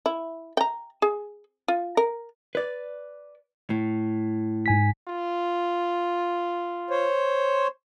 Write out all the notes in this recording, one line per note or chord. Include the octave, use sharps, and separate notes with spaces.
E4
G5 A#5
G#4
F4
A#4
B4 D5
A2
G#2 G#5 B6
F4
C5 C#5